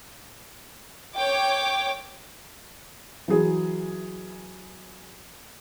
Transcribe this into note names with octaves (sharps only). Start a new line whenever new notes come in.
C#5 G5 D6
E3 F#3 G#4